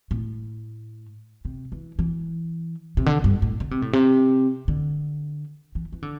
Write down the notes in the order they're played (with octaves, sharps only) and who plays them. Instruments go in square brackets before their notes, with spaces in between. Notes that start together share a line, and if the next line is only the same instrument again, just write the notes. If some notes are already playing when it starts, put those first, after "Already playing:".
[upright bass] A2
C3
E3
E3
C3
D3
G2
A2
D3
C3
A2
C3
D3
E3
E3
D3